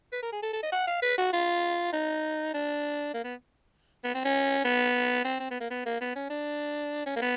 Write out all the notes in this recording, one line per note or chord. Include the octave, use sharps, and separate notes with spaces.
B4
A#4
G#4
A4
A4
D#5
F#5
F5
B4
F#4
F4
D#4
D4
A#3
B3
B3
C4
C#4
B3
C4
C4
B3
A#3
B3
A#3
B3
C#4
D4
C#4
A#3
B3